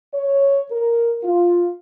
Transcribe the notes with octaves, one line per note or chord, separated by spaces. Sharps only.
C#5
A#4
F4